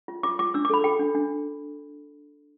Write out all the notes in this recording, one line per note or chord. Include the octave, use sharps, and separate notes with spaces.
F4
F4 D6
F4 D6
D4 E6
D6
A4 B5
A4 G5
D4
D4